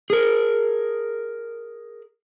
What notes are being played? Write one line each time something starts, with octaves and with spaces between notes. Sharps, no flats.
G#4 A#4